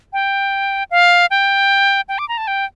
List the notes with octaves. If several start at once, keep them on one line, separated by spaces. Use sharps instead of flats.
G5
F5
G5
G5
D6
A#5
A5
G5